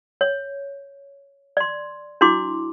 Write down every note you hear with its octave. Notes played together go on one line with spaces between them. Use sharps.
C#5
D5 C6
D4 E4 F#4 C6 D6